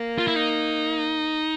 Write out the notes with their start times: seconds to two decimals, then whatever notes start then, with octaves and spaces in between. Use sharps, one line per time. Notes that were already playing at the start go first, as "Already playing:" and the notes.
Already playing: A#3
0.18 F4
0.28 E4
0.36 D#4